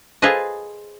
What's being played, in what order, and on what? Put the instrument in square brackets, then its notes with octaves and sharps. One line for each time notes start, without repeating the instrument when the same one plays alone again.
[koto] F4 G#4 A4 B4 C5 D#5